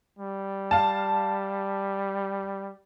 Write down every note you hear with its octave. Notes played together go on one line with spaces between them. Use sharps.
G3
F5 A5